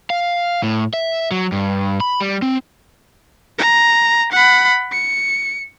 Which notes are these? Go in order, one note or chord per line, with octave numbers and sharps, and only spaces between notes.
F5
A2
E5
F#3
G2
B5
G3
C4
A#5
F#5 B5
C#7